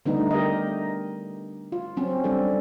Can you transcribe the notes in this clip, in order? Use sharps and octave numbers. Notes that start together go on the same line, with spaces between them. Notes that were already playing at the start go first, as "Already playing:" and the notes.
D3 G3 A3 B3 D4 D#4
G4 A#4 D#5
F4
F#3 C4 C#4
G3 D4 A4 D5